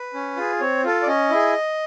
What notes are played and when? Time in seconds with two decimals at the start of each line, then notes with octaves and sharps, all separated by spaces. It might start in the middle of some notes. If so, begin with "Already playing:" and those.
Already playing: B4
0.14 C#4
0.37 F4 G#4
0.60 C4 C#5
0.84 F4 A4
1.02 D5
1.07 C#4 D#5
1.30 E4 G#4